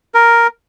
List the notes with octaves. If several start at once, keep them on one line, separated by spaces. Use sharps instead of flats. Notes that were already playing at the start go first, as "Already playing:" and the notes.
A#4